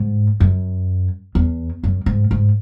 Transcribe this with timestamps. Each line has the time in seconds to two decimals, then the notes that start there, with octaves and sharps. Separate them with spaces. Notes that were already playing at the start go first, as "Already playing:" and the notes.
Already playing: G#2
0.40 F#2
1.35 E2
1.84 F#2
2.06 G#2
2.31 G#2